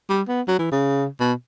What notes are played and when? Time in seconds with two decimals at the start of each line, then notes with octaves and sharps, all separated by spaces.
0.10 G3
0.28 B3
0.48 F#3
0.59 E3
0.72 C#3
1.20 B2